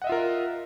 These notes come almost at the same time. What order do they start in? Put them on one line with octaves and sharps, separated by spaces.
F#5 D#5 E5 F4 A#4